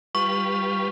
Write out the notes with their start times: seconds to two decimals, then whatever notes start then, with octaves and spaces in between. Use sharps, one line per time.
0.15 G3 F4 B4 C#6